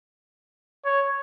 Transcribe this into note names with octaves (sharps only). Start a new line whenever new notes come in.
C#5